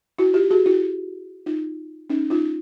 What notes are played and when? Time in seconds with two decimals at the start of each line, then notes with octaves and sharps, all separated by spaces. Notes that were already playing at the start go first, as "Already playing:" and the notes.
0.18 E4 F#4
0.34 F4 G4
0.50 F#4 G#4
0.66 E4 F#4
1.46 D#4 F4
2.10 C#4 D#4
2.30 D#4 F4